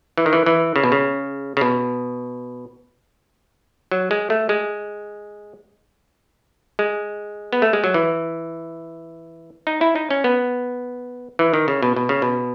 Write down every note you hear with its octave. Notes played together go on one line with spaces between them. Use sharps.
E3
D#3
E3
E3
C#3
B2
C#3
C#3
B2
F#3
G#3
A3
G#3
G#3
B3
A3
G#3
F#3
E3
D#4
E4
D#4
C#4
B3
E3
D#3
C#3
B2
B2
C#3
B2